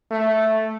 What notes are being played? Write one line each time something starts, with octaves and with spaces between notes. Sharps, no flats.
A3